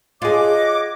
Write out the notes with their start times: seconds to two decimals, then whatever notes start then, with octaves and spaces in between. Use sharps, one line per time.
0.22 F4 G#4 C#5 D#5 F#5 D6